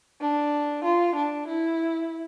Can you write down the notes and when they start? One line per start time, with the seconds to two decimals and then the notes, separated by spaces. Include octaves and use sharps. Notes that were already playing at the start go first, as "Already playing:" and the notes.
0.21 D4
0.85 F4
1.16 D4
1.48 E4